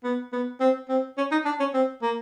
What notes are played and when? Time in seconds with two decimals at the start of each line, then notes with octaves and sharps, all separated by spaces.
0.04 B3
0.33 B3
0.60 C4
0.89 C4
1.17 C#4
1.32 D#4
1.45 D4
1.60 C#4
1.74 C4
2.02 A#3